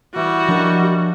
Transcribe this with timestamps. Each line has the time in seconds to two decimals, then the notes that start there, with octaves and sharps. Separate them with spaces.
0.16 E3 G3 E4 F#4 G5
0.48 F3 D4 A#4 D#5